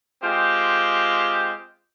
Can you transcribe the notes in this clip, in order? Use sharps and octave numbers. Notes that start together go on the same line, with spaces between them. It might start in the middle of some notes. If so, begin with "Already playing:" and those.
G#3 C4 F4 G4